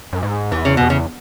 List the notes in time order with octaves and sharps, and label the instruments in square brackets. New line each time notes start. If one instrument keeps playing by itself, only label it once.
[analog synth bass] F#2
G#2
[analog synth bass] E2 [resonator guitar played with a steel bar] E3
[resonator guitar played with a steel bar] C#3
[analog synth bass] E2 [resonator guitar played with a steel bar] B2
[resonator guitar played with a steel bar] C#3